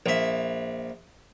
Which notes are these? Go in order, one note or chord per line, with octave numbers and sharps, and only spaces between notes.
A#1 E5